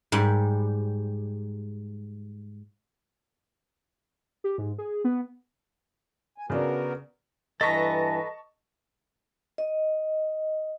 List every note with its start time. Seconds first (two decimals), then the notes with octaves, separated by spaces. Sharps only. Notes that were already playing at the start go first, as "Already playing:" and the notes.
0.12 G#2 G3
4.44 G4
4.58 G#2
4.78 G#4
5.04 B3
6.38 G#5
6.50 C#3 B3 D4 F#4 A#4
7.61 G2 E3 A4 B4 D#5 A5 A#5 C#6
9.58 D#5